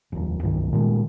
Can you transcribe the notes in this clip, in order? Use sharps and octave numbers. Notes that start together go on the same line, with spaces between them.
F1 D#2
C2 G2 D#3
A#2 D#3 G#3